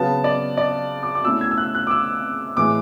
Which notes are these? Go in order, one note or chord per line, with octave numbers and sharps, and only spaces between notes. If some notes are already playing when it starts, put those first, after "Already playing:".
Already playing: C#3 F#3 B3 A5
D5
D5
D6
D6
B2 A3 C#4 E4 E6
G#6
E6
F#6
F#6
D6
E6
A2 E3 G#3 D6